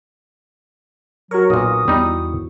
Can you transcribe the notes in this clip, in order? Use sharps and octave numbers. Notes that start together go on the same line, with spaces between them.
F#3 F#4 A#4 C#6
B1 A#2 D#6
E2 G3 D#4